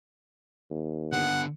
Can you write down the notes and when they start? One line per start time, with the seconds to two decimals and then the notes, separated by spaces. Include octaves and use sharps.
0.70 D#2
1.13 D3 B3 F#5